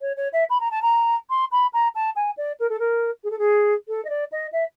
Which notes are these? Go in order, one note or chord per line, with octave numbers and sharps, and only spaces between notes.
C#5
C#5
E5
B5
A#5
A5
A#5
C6
B5
A#5
A5
G#5
D5
A#4
A4
A#4
G#4
A4
G#4
A4
D#5
D5
D#5
E5